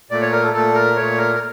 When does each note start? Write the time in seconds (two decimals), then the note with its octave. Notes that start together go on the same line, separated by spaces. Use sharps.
0.11 A#2 A3 D5
0.21 C#5
0.32 A#4
0.43 A4
0.54 A#2 A3 A4
0.75 A#4
0.96 A#2 A3 C#5
1.18 A#4
1.34 A#4